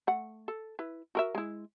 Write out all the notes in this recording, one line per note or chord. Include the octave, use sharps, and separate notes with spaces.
A3 F#5
A4
E4 B4
F#4 A#4 E5
G#3 E4